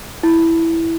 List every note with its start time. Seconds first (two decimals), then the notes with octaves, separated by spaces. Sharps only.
0.23 E4